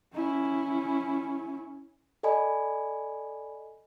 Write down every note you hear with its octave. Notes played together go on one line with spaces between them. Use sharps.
C#4 E4
A4 D5 D#5 G#5 B5